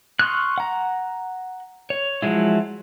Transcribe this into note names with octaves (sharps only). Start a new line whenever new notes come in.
C6 C#6 D#6 F6 F#6
F#5 A#5
C#5
F3 F#3 G#3 E4